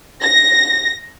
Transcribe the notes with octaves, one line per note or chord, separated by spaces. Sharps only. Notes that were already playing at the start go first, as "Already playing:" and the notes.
A#6